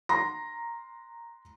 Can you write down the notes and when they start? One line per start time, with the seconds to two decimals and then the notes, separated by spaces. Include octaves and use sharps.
0.09 A#5 C6 A#6